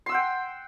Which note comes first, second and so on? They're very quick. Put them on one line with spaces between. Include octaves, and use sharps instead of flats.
C6 E6 F#5 G5